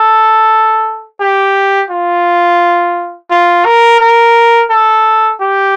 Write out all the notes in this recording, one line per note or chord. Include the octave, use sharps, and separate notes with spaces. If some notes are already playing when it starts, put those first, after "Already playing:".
Already playing: A4
G4
F4
F4
A#4
A#4
A4
G4